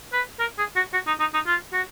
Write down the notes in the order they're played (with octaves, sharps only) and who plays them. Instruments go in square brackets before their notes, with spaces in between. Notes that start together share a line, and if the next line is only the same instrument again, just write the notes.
[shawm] B4
A#4
G#4
F#4
F#4
D#4
D#4
D#4
F4
F#4